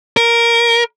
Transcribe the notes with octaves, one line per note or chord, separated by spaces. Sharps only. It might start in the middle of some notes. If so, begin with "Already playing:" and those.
A#4